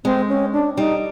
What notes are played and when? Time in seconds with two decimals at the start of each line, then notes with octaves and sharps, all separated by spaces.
0.04 G#3 C4
0.29 C#4
0.53 D4
0.77 G3 D#4